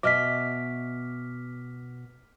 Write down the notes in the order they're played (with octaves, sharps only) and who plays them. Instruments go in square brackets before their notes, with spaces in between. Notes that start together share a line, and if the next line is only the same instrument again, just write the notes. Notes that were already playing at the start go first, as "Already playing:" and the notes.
[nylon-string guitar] B2 D#5 E5 [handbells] D6 F6 B6